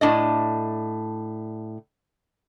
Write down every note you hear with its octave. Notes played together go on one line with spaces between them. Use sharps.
A2 D4 D#5